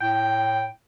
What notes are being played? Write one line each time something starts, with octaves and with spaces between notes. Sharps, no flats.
A2 G5